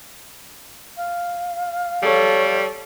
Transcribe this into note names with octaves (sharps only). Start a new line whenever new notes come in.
F5
G3 A4 C#5